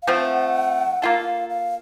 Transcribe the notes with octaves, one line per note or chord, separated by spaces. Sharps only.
F5
F3 A3 C4 F#5
A#3 F4 A4 F5
F5